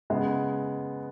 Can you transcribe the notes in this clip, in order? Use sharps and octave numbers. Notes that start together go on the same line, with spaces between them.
C#3 G#3 B3